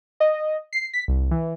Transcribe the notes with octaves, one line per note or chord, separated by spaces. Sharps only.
D#5
C7
B6
C2
E3